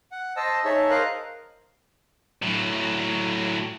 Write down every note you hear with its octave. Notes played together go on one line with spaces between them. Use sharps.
F#5
C5 D#5 A5 E6
D#4 G#4 C#5 E5 A5
A#4 C5 D#5 F5 F#6
A2 F#3